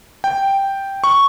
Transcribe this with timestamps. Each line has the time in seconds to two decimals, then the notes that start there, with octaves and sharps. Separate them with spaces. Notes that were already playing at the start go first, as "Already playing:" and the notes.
0.24 G5
1.04 C#6